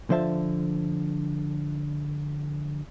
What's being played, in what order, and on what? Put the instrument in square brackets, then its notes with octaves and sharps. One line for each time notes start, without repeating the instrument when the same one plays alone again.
[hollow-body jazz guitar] D3 F3 C5 E5 A5